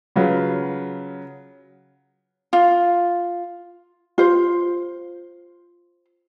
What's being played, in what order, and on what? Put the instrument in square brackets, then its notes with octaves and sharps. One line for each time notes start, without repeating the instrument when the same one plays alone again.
[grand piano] C#3 F#3 F4 B4
[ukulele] F4
F4 C5